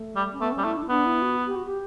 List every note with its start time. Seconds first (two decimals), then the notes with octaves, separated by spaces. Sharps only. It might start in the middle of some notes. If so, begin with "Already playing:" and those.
Already playing: A3
0.16 G3
0.33 C#4
0.40 A3 B3
0.52 C#4
0.58 G3
0.64 A3 E4
0.77 D4
0.83 E4
0.89 B3 D4
1.06 E4
1.22 F#4
1.47 G4
1.56 F#4
1.66 G4